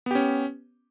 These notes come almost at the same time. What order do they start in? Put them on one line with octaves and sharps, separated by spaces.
B3 G4 C#4